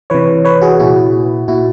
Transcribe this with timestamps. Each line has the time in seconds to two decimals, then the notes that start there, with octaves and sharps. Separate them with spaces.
0.10 C3 E3 B4 C#5
0.45 B4 C#5
0.61 F#4 G#4
0.79 A#2 E4 F#4
1.48 A#2 E4 F#4